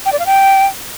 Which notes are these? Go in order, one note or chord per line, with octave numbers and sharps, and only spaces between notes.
G5
D5
F5
G5